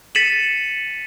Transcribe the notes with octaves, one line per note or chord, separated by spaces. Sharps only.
A6 B6 C#7 D#7 E7 F#7